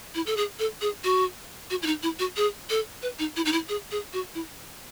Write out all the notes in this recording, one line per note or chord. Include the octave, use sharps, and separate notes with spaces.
E4
A4
G#4
A4
G#4
F#4
F#4
E4
D#4
E4
F#4
G#4
A4
B4
D#4
E4
D#4
E4
G#4
G#4
F#4
E4